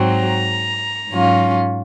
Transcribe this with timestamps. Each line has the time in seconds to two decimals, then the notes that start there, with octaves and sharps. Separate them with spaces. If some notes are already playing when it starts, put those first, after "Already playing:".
Already playing: G#2 F#3 C4
0.16 A#5
1.10 G#2 F#3 C#4 F4